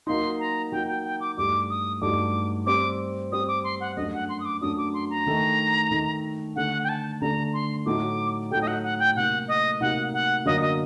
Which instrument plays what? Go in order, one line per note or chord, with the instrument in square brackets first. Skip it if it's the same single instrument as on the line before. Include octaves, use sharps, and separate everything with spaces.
[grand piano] F#3 A#3 D#4 [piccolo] C6
[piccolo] A#5
[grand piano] F#3 A#3 D#4 [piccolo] G5
[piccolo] G5
G5
D6
[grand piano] G2 F#3 A3 D#4 G4 [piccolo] D6
[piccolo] D#6
[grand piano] G2 F#3 A3 D#4 G4 [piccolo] D6
[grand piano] G3 C4 G4 C5 [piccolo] D6
[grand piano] G3 C4 G4 C5 [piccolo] D#6
[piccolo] D6
C6
F#5
[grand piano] F#2 F#3 A3 D4 [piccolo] D#5
[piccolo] F#5
C6
D#6
D6
[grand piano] F#2 F#3 A3 D4 [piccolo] D#6
[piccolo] D6
C6
A#5
[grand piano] D#3 A3 D#4
D#3 A3 D#4
[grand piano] D3 A3 D4 A4 [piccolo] F#5
[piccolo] G5
A5
[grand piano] D3 A3 D4 A4 [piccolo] A#5
[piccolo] C6
[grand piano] A2 F#3 A3 D#4 A4 [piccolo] D6
[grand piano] A2 F#3 A3 D#4 A4 [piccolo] G5
[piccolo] D#5
F#5
F#5
G5
[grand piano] C3 F#3 A#3 D#4 [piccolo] F#5
[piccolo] D#5
[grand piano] C3 F#3 A#3 D#4 [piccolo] F#5
[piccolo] F#5
[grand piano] F#2 D3 F#3 A#3 [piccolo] D#5
[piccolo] D#5